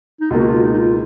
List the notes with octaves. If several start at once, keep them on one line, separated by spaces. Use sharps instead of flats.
D#4
C#2 B2 A#3 F4
F#4
F4
D#4
D#4
F4